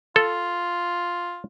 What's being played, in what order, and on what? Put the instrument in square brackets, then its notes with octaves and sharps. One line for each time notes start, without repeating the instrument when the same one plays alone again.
[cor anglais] F4 [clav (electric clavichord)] A4